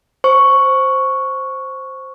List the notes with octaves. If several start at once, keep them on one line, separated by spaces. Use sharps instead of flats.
C5 C#6